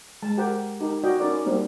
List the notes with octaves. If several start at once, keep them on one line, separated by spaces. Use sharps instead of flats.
G#3 A5
G4 A#4 C5 F#5 G5
D#4 G4 A#4
F#4 D5 D#5 G5
C#4 D#4 A#4 D5
G3 A#3 C4 D4 D#4 G4